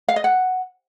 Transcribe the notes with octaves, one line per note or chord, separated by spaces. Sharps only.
F5
D#5
F#5